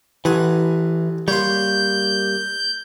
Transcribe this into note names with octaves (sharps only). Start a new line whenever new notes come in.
A1 E3 F#5 G#5
G3 A#3 C#5 C6 G6